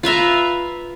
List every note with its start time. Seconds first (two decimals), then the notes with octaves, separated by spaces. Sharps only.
0.03 F4 B4 E5 A#5